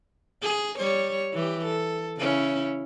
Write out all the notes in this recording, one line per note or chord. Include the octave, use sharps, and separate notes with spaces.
G#4
G3 C#5
E3 G4
A4
C#3 C#4 E4